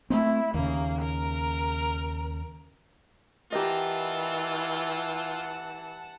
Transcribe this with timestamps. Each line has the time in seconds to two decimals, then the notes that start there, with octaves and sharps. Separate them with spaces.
0.10 A3 B3 C4 E4
0.54 D#2 C#3 A#3
1.01 A#4
3.52 E3 F4 G4 A#4 D#5 F#5 A5